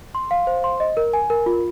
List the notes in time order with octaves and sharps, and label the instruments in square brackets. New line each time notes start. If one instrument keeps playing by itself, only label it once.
[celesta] C6
F5
C5
C6
D#5
A#4
G#5
A#4
F4